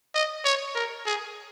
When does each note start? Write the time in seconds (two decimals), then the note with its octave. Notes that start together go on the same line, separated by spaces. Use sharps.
0.15 D#5
0.44 C#5
0.75 A#4
1.06 G#4